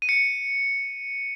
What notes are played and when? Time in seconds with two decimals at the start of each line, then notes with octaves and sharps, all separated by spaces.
0.02 D#7
0.09 C#7